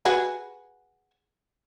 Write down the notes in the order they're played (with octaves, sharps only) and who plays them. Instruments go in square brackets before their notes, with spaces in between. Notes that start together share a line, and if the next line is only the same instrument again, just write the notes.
[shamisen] F#4 G#4 B4